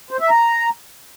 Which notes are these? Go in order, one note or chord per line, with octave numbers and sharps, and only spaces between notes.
C5
E5
A#5